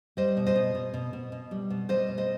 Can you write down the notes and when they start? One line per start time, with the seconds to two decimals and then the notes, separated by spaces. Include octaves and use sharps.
0.17 G3 C5 D#5
0.37 B2
0.46 C5 D#5
0.55 B2
0.75 B2
0.94 B2
1.13 B2
1.32 B2
1.51 G3
1.70 B2
1.89 G3 C5 D#5
2.08 B2
2.18 C5 D#5